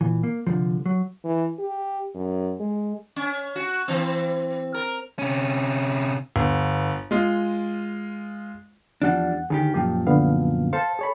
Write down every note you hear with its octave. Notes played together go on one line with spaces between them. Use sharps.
A#2 E3
A#3
C2 B2 D3 F3
F#3
E3
G4
F#2
G#3
C#4
F#4
E3 C4
A#4
C3 C#4
G1
G#3 F4 D#5
E2 F3 G3 D4 F#5
D2 D#3 G4 G#4
F#2 A#2 F3 G4
D3 B3 F5
A4 C5 F5 A5
G#4 C#5 B5